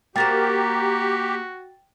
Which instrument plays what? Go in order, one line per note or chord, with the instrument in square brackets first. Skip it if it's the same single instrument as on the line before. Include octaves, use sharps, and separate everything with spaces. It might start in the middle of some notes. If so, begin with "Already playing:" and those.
[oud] A#3 A#4 C5 [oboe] F#4 [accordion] G4 [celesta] G5 A6